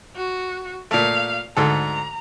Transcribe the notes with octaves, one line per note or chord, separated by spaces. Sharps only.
F#4
A#2 A3 F5
D2 G#2 A4 A#5